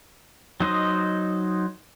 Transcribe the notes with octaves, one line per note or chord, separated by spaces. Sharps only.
F#3 D#4 C5 D#5